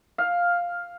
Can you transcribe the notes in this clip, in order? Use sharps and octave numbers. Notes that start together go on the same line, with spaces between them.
F5